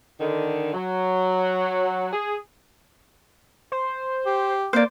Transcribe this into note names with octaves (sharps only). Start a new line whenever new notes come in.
D3 D#3
F#3
G#4
C5
G4
A#3 C5 D5